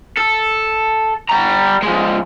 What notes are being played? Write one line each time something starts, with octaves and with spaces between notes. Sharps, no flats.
A4
G3 A#5
F3 G#3